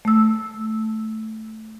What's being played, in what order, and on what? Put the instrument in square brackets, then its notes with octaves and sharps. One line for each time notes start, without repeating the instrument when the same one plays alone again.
[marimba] A3 E6